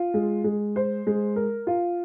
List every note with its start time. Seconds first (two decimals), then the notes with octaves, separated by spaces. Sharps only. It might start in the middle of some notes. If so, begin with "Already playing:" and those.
Already playing: F4
0.14 G#3
0.44 G#3
0.76 C5
1.07 G#3
1.36 A#4
1.67 F4